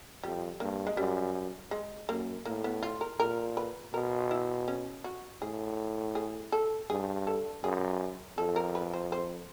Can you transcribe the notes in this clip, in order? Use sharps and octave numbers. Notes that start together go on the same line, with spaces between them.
F2 G3
G2 A#3
G#3
F#2 G3
G#3
F#2 A#3
A2 A#3
B3
F4
A#4
A#2 A#4
B4
B2 A#4
E4
C#4
F#4
A2 G#4
G#4
A4
G2 G#4
A4
F#2 G#4
F2 A4
A#4
B4
C5
C5